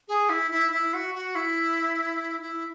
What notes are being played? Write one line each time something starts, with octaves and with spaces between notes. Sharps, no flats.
G#4
E4
E4
E4
F#4
F#4
E4
E4